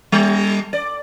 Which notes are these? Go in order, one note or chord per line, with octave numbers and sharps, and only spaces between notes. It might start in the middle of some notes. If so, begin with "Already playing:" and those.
G3
D5